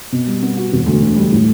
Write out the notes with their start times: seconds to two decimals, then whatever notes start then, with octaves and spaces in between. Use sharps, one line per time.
0.12 B2
0.27 G3
0.42 B3
0.57 F#4
0.72 E1
0.86 D2
1.02 D3
1.16 G3
1.32 A2